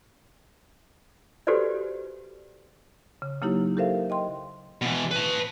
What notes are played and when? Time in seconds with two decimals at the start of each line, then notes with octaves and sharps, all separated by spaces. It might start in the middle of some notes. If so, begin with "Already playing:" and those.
1.47 F#4 G4 A4 B4 C5 D5
3.22 C#3
3.41 C#3 F#3 A#3 D#4 E4 G4
3.77 G4 A4 A#4 C5 E5 F5
4.10 D#5 G5 C6
4.82 B2 E3
5.11 B4 A5